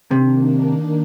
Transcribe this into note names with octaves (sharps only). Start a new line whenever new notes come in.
C3 D#3 A#3 D4